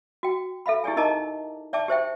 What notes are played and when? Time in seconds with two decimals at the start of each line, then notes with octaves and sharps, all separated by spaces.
0.23 F#4 G5
0.66 A4 E5 F5 B5
0.84 E4 G4 G#4 D5 G#5
0.96 D#4 A#4 D#5 A5 A#5 D6
1.73 D5 E5 G5 A5 D6
1.88 G4 C5 E5 G5